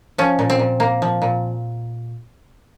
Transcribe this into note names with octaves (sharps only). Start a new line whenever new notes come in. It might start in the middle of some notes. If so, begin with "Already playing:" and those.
F3 C#4
A#2
C4
A#2
A#3
F3
A#2